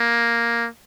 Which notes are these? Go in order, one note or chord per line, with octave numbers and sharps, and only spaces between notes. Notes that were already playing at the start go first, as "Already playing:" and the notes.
Already playing: A#3